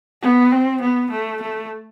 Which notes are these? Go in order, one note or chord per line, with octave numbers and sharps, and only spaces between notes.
B3
C4
B3
A3
A3